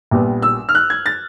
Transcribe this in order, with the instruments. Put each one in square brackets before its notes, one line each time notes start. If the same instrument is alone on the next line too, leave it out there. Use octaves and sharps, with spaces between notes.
[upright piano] A#1 A#2 G3 B3
E6
F6
F#6
G#6
A6